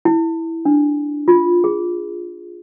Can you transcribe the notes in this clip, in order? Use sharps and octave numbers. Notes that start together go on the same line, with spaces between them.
E4
D4
F4
G#4